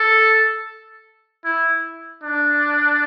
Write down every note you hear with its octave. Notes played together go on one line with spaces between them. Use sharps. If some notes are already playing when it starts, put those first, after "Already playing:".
Already playing: A4
E4
D4